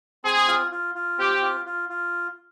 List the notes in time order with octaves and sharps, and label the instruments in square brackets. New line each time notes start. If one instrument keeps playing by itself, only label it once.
[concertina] C4 [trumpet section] G#4
[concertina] F4
F4
F4
[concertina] C4 [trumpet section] G4
[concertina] F4
F4
F4